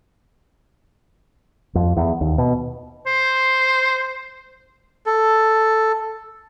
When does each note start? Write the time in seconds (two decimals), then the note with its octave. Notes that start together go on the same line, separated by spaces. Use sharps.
1.75 F2
1.96 E2
2.21 D#2
2.38 B2
3.06 C5
5.06 A4